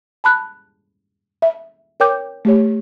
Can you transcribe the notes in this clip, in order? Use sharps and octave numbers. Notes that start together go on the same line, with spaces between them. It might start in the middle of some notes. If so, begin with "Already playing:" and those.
A5 B5 F#6
E5
A#4 C#5 G5 D6 G6
A3 G4 C#5